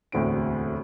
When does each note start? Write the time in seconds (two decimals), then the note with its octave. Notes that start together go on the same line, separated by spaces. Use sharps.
0.12 E1 D2 A2 D3 C4 D7